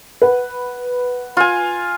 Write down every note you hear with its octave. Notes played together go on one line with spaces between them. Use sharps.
B4 F#5
F4 G#5